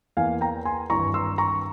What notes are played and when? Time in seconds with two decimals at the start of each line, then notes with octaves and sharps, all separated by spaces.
0.17 E2 E3 A#3 F5 G#5
0.41 G5 A#5
0.65 G#5 C6
0.90 G#1 G2 E3 A#5 C#6
1.14 C6 E6
1.38 A#5 C#6